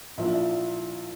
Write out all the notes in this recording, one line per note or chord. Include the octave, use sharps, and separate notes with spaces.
A#1 A#2 F3 E4
D4
E4